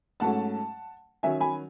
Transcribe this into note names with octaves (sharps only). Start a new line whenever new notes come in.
G#2 F#3 A3 C#4 F#5 A5
D#3 F#3 C#4 E5 G#5
G#5 B5